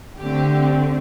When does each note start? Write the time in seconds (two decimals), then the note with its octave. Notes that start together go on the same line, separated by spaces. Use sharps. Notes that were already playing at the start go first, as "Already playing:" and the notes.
0.19 D3 A3 C4 G4